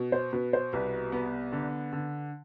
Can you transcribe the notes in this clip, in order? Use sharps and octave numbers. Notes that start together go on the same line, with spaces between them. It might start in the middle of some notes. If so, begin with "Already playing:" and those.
Already playing: B2
C5
B2 B4
C5
C2 B4
B3 B4
D3
D3